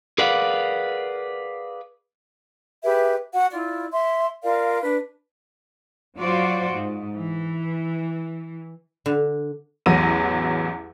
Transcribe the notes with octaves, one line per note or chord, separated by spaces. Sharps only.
G#4 A#4 B4 D5 F5 F#5
G4 G#4 B4 E5
F#4 F#5
E4 F4 D5
E5 C6
F4 A#4 D5 F5
D4 B4
F#3 F4 F#4 C5 D5
G#2
E3
D3
A1 E2 F#3 A#6 D#7